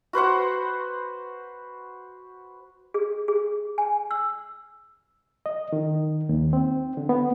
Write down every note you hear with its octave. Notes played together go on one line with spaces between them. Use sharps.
F#4 B4 C5 F#5
G#4
G#4
G#5
E6
D#5
D#3
D#2
C4
D3
B3